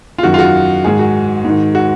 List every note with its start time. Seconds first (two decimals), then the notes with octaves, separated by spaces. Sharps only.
0.18 F4
0.23 F#2 D#3 F#4
0.34 F4
0.39 F#4
0.84 G#2 D#3 G#4
0.99 F#4
1.44 G#2 D#3
1.75 F#4